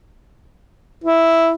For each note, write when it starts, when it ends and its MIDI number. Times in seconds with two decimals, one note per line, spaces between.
1.04 1.52 64